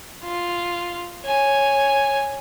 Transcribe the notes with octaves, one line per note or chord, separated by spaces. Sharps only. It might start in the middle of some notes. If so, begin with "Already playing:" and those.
F4
C#5 G#5